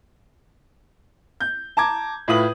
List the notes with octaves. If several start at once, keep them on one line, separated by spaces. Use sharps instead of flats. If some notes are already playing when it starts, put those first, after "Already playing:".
G6
A5 A#5 D6 G#6
A2 F4 B4 D#6 F#7